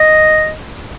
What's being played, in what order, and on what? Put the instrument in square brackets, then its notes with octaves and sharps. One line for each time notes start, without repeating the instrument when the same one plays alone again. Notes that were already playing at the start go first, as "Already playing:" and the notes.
Already playing: [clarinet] D#5